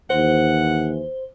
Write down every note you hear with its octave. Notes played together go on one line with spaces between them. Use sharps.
D#2 E3 C5 F#5